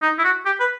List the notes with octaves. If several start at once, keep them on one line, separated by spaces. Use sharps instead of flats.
D#4
E4
F#4
G4
B4